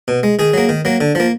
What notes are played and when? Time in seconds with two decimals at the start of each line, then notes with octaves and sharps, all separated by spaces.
0.08 B2
0.23 G#3
0.39 D#3 G#4
0.54 F#3 A#3
0.69 D#3
0.85 F#3 A#3
1.01 D3
1.15 F3 A#3